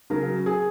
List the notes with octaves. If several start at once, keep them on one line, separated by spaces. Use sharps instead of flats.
C#3 F#3 A#4
G#4